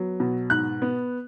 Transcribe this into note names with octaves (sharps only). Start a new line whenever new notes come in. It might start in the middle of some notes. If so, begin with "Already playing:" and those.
Already playing: F#3 B3
B2
G#2 F#6
B3